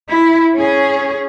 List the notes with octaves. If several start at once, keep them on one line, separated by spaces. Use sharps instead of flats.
E4
C#4 G#4